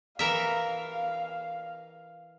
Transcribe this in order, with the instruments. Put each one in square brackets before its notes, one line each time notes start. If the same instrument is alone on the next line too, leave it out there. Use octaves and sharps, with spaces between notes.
[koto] E3 A#4 E5 [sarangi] F5